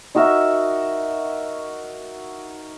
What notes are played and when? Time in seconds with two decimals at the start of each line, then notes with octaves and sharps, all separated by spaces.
0.15 D#4 F#4 A#4 E5